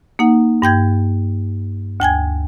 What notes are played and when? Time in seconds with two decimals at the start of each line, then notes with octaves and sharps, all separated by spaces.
0.19 A#3 D#4 F#5
0.62 G2 G5 G6 G#6
2.00 D2 G5 G#5 G#6